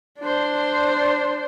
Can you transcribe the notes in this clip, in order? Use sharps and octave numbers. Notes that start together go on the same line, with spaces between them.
D4 C5